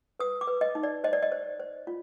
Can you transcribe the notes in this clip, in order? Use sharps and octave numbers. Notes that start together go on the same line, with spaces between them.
B4 D#6
D6
B4
D#5
D#4
D5
C5 D#5
D5
D#5
C5
C5
F4